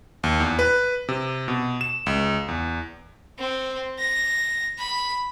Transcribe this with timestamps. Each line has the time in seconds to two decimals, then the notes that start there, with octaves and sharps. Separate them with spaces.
0.24 D#2
0.40 E2
0.59 B4
1.09 C3
1.48 B2
1.81 E7
2.06 C#2
2.48 E2
3.39 C4
3.99 A#6
4.79 B5